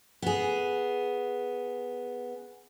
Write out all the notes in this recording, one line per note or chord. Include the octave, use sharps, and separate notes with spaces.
B3 G#4